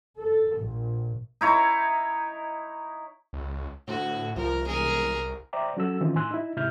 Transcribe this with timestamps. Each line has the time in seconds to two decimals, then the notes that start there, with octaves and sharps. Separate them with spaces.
0.19 A4
0.57 A#1
1.41 D#4 E4 C#5 A#5
3.33 C#2
3.88 D2 A2 F#4
4.36 C2 F3 A#4
4.66 E1 G#4 A#4
5.53 C5 D5 E5 G5 A#5 D6
5.77 F#3 C#4 F#4 A4 E6
6.01 D#3 E3 C4 C#4 D#4 F4
6.15 A2 E4 G#5 C6 E6 F#6
6.31 D#4 E4
6.57 G#2 C3 E4 E5 F6 G6